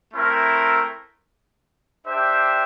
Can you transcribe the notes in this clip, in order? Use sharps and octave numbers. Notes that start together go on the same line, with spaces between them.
A3 C4 E4 A#4
D4 G4 C5 E5 G5